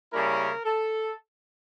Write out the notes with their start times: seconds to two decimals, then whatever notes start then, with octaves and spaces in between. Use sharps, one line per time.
0.13 C#3 G3 A#3 C#4 E4 A#4
0.64 A4